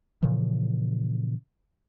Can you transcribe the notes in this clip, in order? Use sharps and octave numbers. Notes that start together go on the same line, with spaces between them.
A#2 C#3 E3 F3